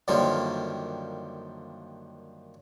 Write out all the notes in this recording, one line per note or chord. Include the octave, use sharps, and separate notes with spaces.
F#2 D3 D#3 F3 G3 A#3